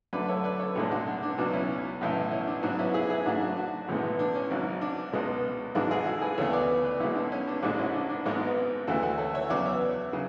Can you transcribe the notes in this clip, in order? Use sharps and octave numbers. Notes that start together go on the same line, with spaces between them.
F#2 D3 A3 B4 D5
A4 C#5
B4 D5
A4 C#5
B1 A2 G#3 D4
D4 F#4
D4
D4
C#2 B2 F#3 D4
C#4 E4
B1 A2 E3
C#4 E4
D4
G#2 F#3 B3 D4
C#4 E4
E4 G#4
E4 G#4
G#2 F#3 A3 D4 F#4
D4 F#4
D4 F#4
B1 A2 E3 G#3 B3
D4
C#4
G#1 G#2 F#3
D4
C#2 B2 G#3 B3
G#1 G#2 E3 G#3 D4 F#4
E4 G#4
F#4 A4
G#4 B4
D2 C#3 E3 B3 A4 C#5
B4 D5
B4 D5
B1 B2 G#3 C#4 E4
D4
C#4
D4
A1 G#2 G#3 D4 F#4
C#4 E4
D4
D4
G#1 G#2 G#3 B3
D2 C#3 E3 A3 F#4 A4
F#4 A4
A4 C#5
C#5 E5
E2 C#3 F#3 B3 D5 F#5
C#5 E5
C#3 F#3